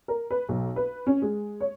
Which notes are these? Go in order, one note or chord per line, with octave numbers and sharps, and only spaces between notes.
A#4
B4
B1
B4
C#4
G#3
C#5